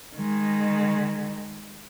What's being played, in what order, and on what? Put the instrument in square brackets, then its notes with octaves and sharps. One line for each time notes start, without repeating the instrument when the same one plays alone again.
[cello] D#3 G#3